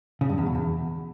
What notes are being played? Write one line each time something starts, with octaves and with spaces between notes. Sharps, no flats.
C#3
G2
E2
B2
E2